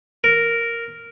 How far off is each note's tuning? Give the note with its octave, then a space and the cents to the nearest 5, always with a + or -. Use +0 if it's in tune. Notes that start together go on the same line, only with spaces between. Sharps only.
A#4 -5